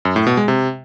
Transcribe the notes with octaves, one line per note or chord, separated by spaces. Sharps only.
F#2
A2
B2
G#3
C3